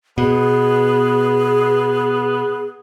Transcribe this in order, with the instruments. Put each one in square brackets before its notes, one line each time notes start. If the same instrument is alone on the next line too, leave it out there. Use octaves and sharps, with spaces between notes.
[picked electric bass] B2 [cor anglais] B3 [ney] G#4